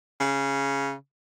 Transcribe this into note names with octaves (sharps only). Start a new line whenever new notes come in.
C#3